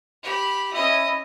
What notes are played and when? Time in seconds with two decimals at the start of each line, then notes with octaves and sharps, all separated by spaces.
0.23 G4 B5
0.73 C#4 E4 D#5